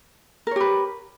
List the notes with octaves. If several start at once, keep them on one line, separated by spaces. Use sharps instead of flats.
G4 A#4 B4 C#5